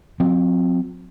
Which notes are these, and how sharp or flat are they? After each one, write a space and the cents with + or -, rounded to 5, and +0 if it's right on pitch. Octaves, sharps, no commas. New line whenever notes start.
F#3 -45 C4 +0